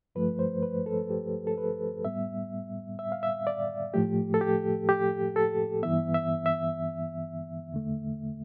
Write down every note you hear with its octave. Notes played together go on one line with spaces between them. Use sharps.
G2 F3 A3 B4
C5
B4
A4
G4
A4
B4
A2 G3 B3 E5
E5
F5
E5
D5
A2 F3 A3 G4
A4
G4
G4
A4
G2 E3 B3 E5
E5
E5
E2 D3 A3